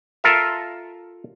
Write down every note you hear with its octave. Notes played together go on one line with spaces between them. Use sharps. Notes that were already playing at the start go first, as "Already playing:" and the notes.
F4 A4 A#4 E5